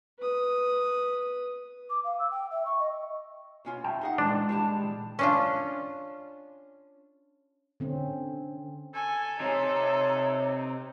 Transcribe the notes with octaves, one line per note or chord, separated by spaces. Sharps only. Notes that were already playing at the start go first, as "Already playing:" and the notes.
B4 D#6
D6
F5
E6
G5
E5
C#6
D#5
B2 C#4 F4
E5 G5
D#4 G#4 F#5
A#2 E3 G#3 D4 A5
G3 E4 A5
C#4 D4 F4
D3 C4 C#4
A4 G#5
C3 D#4 C#5